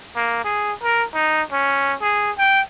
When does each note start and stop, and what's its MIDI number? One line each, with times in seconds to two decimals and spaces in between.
0.16 0.41 58
0.44 0.73 68
0.83 1.04 70
1.14 1.42 63
1.52 1.94 61
2.02 2.31 68
2.38 2.61 79